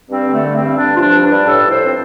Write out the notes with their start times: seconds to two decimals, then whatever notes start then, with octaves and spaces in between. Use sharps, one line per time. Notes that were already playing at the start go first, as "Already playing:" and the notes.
0.09 G2 C4
0.26 D3
0.33 A3
0.44 G2
0.55 C4
0.61 G2
0.77 G2 D4
0.96 F3 F4
1.01 D4
1.12 G2
1.24 D4
1.29 G2
1.46 A2 A4
1.64 A2
1.70 C5
1.82 F3 C4